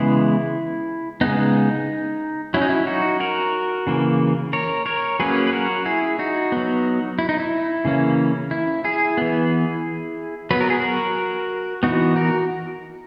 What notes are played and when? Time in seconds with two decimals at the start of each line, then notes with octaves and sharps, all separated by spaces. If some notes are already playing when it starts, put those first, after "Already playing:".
Already playing: C#3 E3 G#3 B3 E4
1.21 C#3 G#3 B3 D#4
2.54 F#3 C#4 E4
2.62 D#4
2.69 E4
2.87 D#4 F#4
3.20 F#4 A#4
3.87 C#3 E3 A#3
4.53 A#4 C#5
4.86 A#4 C#5
5.20 F#3 A#3 C#4 G#4 B4
5.47 B4
5.53 F#4 A#4
5.86 E4 G#4
6.19 D#4 F#4
6.52 F#3 B3
7.19 E4
7.29 D#4
7.40 E4
7.85 C#3 E3 A#3 C#4
8.51 E4
8.84 E4 G#4
9.17 E3 B3
10.51 F#3 B3 B4
10.61 A#4
10.70 G#4
10.80 F#4 A#4
11.83 E3 B3 D#4 F#4
12.16 F#4 A#4